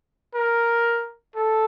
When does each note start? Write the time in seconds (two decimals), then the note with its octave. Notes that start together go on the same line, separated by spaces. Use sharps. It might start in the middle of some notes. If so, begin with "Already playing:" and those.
0.35 A#4
1.35 A4